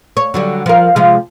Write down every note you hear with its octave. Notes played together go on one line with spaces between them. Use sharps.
C#5
D3 F#3 G3
F3 A#4
C3 F3 G#3